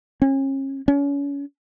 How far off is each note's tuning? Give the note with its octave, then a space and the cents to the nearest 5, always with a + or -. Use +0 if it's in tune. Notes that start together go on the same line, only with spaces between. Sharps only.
C#4 -35
C#4 +30